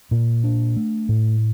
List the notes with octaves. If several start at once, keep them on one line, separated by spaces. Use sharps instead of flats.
A#2
D4
A3
A2